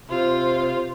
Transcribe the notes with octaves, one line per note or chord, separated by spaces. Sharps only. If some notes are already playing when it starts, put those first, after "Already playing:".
C3 F4 C5